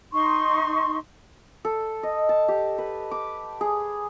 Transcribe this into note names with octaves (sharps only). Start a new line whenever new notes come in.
D#4 C6 C#6
A4
D#5
A5
G4
B4
D6
G#4